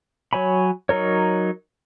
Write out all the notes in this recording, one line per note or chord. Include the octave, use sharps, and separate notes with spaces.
F#3 C#5 G#5 B5
F#3 D#4 A#4 C#5